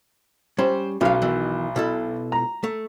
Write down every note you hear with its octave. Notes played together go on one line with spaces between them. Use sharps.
G3 C#4 C5
B1 C#4 F5
B2 D#3 E3
B2 E4 A4
A#5
A3